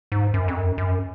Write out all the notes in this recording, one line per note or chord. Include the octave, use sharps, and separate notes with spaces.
G#2
F#2
F2
F#2
F#2